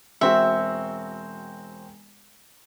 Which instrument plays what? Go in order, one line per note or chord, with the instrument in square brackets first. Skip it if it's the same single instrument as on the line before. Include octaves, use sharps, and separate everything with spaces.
[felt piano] E1 C4 F#4 [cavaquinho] E5